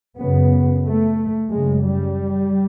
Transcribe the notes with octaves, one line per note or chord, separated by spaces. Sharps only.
F#2 C#3 B3
A3
F#2 C#3 G#3
G3